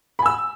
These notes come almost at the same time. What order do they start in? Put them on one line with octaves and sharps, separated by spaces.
B5 G#5 E6